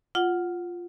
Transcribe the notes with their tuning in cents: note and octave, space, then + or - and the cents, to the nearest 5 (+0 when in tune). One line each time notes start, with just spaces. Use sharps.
F4 +0 F#5 +0